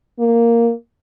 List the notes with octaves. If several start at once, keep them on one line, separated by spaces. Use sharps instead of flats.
A#3